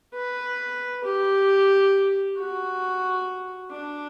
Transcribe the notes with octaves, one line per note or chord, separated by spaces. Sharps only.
B4
G4
F#4
D4